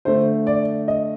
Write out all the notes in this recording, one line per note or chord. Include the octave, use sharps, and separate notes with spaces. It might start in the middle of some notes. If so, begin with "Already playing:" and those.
D3 A3 C5
D5
D#5